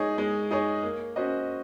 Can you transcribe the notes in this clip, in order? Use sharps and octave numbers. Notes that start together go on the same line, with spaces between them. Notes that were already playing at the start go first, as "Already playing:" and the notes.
Already playing: G#3 D#4 G#4 C#5
G#3
D#4 G#4 C#5
A#3
C#4 F#4 C5 D#5